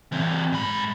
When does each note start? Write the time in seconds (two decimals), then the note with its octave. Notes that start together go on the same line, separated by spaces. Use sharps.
0.12 E3 C4
0.52 G#2 B5